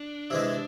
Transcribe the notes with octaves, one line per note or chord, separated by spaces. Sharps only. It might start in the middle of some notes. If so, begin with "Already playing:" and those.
Already playing: D4
C3 E3 G#3